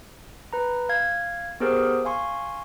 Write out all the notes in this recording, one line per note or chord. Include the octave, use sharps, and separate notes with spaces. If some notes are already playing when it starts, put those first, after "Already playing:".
B4 A#5
F5 G#6
B3 G4 G#4 A#4 C5
F5 G#5 C6 C#6